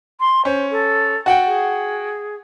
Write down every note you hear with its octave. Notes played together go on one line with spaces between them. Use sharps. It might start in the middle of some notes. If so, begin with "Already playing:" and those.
C6
C#4 C5
A4
F#4 F#5 G5
G#4